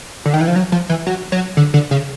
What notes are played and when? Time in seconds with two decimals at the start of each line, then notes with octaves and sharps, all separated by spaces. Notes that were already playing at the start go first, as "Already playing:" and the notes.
0.26 D3
0.34 D#3
0.41 E3
0.48 F3
0.56 F#3
0.72 F3
0.89 E3
1.06 F#3
1.32 F#3
1.57 D3
1.74 D3
1.91 C#3